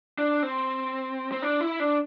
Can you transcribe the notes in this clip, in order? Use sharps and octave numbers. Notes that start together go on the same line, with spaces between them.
D4
C4
C4
D4
E4
D4